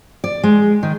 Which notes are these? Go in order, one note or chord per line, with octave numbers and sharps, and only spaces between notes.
D5
G#3
D#3